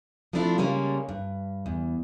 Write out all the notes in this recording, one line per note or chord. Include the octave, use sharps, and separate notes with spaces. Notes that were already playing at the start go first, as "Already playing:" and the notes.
F3 A3 C4 D4 E4 F4
C#3 G3 G#3 A#3 C#4 D4
G2
E2